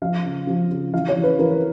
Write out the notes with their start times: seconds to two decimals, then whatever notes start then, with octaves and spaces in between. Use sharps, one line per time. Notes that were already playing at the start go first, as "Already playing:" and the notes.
0.02 F3 F5
0.24 C#3
0.47 F3
0.71 C#3
0.93 E3 F5
1.09 C#5
1.16 E3
1.24 B4
1.39 E3 A#4